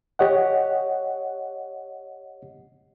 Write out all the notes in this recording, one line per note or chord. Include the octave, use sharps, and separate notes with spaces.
G4 C#5 D#5 F#5